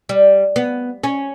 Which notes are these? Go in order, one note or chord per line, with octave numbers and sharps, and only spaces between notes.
G3
B3
C#4